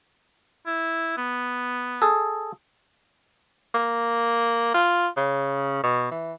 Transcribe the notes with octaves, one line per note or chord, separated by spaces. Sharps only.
E4
B3
G#4 A4
A#3
F4
C#3
B2
E3